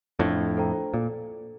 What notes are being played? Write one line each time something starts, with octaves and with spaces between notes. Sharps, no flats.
F2 A2 D4
A4 C5 G5 A#5
A#2 A4